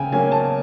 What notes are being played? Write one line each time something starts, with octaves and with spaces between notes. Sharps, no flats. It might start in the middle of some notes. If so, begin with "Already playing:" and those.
Already playing: C#3 G5 G#5
F#3 A#3 C#4 G#5
A5